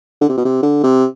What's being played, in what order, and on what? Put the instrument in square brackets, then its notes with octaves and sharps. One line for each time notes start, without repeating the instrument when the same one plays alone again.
[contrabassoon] D3
C3
B2
C3
D3
C3